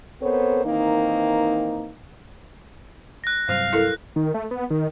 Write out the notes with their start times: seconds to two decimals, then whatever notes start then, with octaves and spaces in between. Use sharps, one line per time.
0.21 B3 C4 A4 A#4 C5 C#5
0.65 D#3 E3 A#3 C4 D#4
3.24 F#6 A#6
3.49 G2 C3 F#3 C5 F5
3.73 E4 A4 A#4
4.16 D#3
4.34 A3
4.51 B3
4.70 D#3